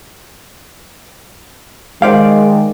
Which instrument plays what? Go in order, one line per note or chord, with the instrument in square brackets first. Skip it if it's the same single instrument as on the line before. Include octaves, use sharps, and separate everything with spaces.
[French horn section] D#3 G#3 [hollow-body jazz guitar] C5 D5 F5